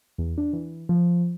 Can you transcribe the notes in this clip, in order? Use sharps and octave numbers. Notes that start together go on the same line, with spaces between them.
E2
D4
E3
F3